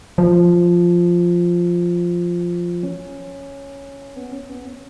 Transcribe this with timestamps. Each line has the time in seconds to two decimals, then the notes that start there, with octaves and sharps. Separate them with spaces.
0.18 F3
2.83 C#4
4.16 B3
4.32 C#4
4.49 B3
4.67 C#4